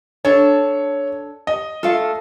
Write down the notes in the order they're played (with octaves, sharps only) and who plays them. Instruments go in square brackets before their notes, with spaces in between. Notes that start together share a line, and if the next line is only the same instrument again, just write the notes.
[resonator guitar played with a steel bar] D4 A4 [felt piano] C#5
[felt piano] D#5
[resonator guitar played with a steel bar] A3 A4 [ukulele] F4 F5